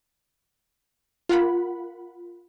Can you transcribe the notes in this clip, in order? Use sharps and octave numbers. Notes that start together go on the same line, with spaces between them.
F4 A#4 F#5 B5